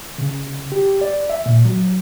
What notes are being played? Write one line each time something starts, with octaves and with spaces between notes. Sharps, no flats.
C#3
G4
D5
E5
A#2
F#3